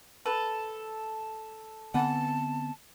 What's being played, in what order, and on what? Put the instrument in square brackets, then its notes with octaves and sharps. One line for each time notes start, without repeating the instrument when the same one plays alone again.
[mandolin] A4 [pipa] B4
[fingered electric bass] D3 B3 C4 [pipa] E3 B4 F#5 [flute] A5